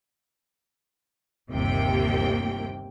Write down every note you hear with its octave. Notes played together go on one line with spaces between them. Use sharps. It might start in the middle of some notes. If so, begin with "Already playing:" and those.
G1 D#2 C3 A#3 G5